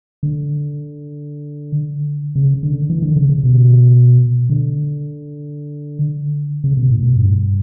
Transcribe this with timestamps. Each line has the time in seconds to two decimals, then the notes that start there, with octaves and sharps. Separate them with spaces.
0.23 D3
2.35 C#3
2.63 D3
2.90 E3
3.02 D3
3.16 C#3
3.29 C#3
3.43 B2
4.49 D3
6.64 C#3
6.77 B2
6.90 A2
7.03 B2
7.17 G2